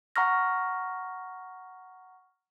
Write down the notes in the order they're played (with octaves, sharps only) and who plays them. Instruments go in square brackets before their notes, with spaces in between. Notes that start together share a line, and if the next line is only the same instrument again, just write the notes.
[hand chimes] F#5 A#5 C#6 F6 A#6